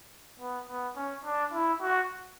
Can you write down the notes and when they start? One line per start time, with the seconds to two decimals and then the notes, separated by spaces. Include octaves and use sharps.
0.39 B3
0.68 B3
0.96 C#4
1.25 D4
1.53 E4
1.81 F#4